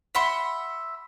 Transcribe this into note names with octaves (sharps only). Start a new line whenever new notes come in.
E5 F#5 B5 C6